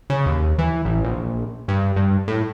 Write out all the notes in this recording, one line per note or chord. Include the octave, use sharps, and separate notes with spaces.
C#3
D#2
E3
A1
A#1
G2
G2
A2